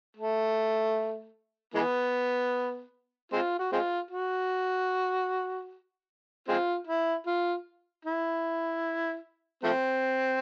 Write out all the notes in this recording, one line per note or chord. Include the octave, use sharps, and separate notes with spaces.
A3
E3 G#3 B3
G#3 C4 F4
F#4
G#3 C4 F4
F#4
G#3 C4 F4
E4
F4
E4
F3 A3 C4